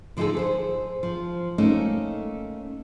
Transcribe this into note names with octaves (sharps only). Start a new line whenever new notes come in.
D3 F3 D#4 F#4 G#4 A4
G#4 B4 C5
F3
A3 A#3 C#4 D#4